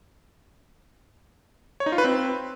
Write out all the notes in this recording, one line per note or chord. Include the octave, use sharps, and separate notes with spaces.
C#5
D#4
F4
B4
C4